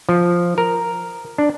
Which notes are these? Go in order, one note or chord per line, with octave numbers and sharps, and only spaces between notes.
F3
A#4
D4